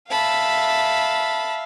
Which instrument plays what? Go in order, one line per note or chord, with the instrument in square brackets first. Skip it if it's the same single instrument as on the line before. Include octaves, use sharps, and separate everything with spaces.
[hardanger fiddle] E5 F5 [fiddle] A5 B5